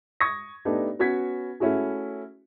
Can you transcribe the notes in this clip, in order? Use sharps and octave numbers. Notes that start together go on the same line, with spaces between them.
C#6 D#6 G#6 A#6
A3 B3 D4 D#4 G4
B3 C#4 F#4 B4 G#6 B6
A3 C#4 E4 F#4 G#4